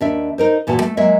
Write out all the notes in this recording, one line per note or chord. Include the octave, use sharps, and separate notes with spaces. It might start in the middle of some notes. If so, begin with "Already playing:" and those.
D#2 D4 E5
D#4 A#4 C5
E2 A#2 E3 F#4 A5
A3
F#3 G#3 A#3 E5